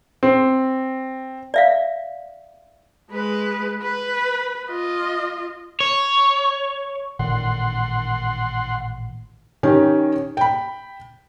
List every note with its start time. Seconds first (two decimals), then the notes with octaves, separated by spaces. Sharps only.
0.23 C4
1.54 D5 E5 F5
3.11 G#3 B4
3.82 B4
4.69 F4 D#5
5.80 C#5
7.19 A1 A#2 D#3 F#5 C6
9.63 D#3 C#4 G4
10.37 G5 B5